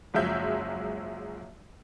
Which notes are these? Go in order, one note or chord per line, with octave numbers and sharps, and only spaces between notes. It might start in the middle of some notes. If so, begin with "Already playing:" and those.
F#1 F3 F#3 G#3 E5 G6